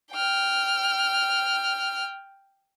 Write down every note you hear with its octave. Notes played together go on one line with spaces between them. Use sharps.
G5 F6